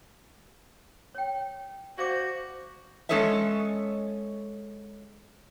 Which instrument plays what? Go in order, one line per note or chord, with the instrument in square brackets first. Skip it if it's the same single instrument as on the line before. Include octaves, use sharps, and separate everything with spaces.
[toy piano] C#5 G5
[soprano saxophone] F#4 [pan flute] C5 [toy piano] D5 F5 D6
[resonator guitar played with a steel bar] G#3 C#4 A4 C#5 D#5 E5